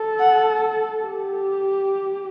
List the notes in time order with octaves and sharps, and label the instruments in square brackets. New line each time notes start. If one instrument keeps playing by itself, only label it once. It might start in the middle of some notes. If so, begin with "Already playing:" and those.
Already playing: [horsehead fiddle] A4
[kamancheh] F#5
[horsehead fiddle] G4